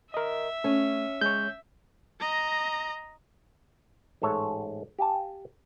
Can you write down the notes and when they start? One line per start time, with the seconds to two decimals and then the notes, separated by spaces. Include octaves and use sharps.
0.14 A#4 D#5 E5
0.64 A3 C#4
1.21 G#3 C#5 G6
2.20 D#5 A#5
4.22 A1 G#2 A4 C#5 E5
4.99 G4 F5 G#5 A5